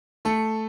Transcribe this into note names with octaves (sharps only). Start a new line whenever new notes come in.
A3 A4